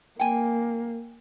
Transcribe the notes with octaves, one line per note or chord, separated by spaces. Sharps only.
A#3 G5 G#5